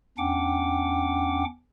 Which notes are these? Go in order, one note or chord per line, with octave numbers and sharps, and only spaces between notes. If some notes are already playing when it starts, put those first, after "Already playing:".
E2 C#4 D4 F#5 G5 D6